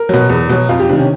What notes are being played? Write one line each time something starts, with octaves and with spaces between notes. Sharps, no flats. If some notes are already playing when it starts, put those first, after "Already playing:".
Already playing: A#4
B2 F#3
E2
B2 F#3
F2 F4
G4
C3 D#3 D4
C#4